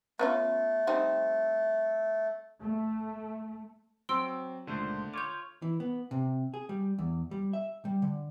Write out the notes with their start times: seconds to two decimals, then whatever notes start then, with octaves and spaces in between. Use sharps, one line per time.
0.19 A3 B3 C#4 F4
0.87 G3 C4 D#4
2.60 A3
4.09 F#3 C4 C6 E6 D7
4.67 C#2 A#2 D3 A3 C5
5.14 F4 C#5 D6 G6
5.62 E3
5.80 B3
6.11 C3
6.54 G#4
6.69 G3
6.99 E2
7.31 G3
7.53 E5
7.85 G3
8.02 D3